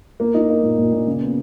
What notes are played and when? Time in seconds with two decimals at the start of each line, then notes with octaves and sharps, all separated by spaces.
0.20 A#3
0.34 D#4
0.49 A#3
0.63 A#2
0.78 A#2
0.92 A#2
1.06 C#3
1.22 B3